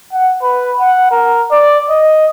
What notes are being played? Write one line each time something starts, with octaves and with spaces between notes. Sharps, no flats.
F#5
B4
F#5
A#4
D5
D#5